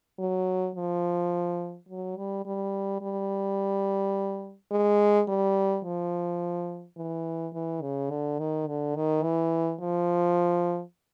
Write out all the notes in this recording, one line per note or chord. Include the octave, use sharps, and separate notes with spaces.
F#3
F3
F#3
G3
G3
G3
G#3
G3
F3
E3
E3
C#3
D3
D#3
D3
D#3
E3
F3